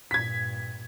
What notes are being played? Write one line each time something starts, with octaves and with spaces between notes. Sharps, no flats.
G2 A#2 G#6 B6